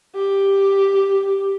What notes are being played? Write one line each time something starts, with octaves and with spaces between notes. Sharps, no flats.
G4